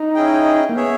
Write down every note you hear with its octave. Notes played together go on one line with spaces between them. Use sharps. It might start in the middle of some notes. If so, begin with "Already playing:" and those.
Already playing: D#4
C#4 E4 G#4 D#5 G5
A#3
B3 G#4 C#5 E5